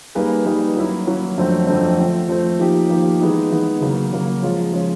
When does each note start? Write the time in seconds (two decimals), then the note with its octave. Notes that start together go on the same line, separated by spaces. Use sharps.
0.15 G3 A#3 D#4 G#4 B4
0.46 G3 A#3 D#4 G#4 B4
0.76 F#3 A#3 C#4 E4
1.07 F#3 A#3 C#4 E4
1.37 F2 D3 F#3 A3 C4
1.67 F2 D3 F#3 A3 C4
1.99 F3 A3 C4
2.28 F3 A3 C4
2.60 F3 A#3 D#4 G4
2.89 F3 A#3 D#4 G4
3.20 E3 G#3 B3 D#4
3.51 E3 G#3 B3 D#4
3.81 C#3 F#3 A#3 C#4
4.12 C#3 F#3 A#3 C#4
4.42 F3 G#3 C#4 F4
4.73 F3 G#3 C#4 F4